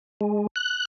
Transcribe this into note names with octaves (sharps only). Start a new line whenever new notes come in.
G#3
F#6